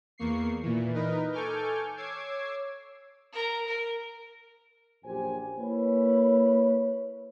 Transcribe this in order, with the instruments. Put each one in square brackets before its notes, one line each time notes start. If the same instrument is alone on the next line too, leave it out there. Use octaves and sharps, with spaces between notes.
[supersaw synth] E2 A#3 C#6 C7
A#2 E3
D#4 A#4 B4
A4 G#5 C#6 D6 F6 G6
C#5 D6 E6 G#6 C7
[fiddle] A#4 A#5
A#4
[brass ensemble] A#1 F#2 G4 C5 G#5
A#3 E4 B4 C#5